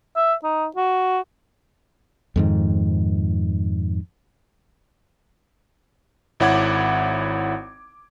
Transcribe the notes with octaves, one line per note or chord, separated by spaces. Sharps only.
E5
D#4
F#4
F2 G#2 D#3
G#1 E4 C#5 F#5 D6 G#6